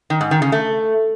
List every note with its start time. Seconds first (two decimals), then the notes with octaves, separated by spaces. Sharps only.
0.10 D#3
0.21 G#2
0.31 D#3
0.42 C#3
0.52 A3